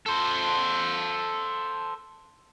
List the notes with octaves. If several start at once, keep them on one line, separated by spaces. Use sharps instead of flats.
A4 C5